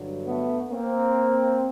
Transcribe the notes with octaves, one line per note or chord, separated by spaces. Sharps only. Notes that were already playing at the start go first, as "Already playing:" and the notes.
Already playing: G2 D3 F#3
A3 B3
A#3 C4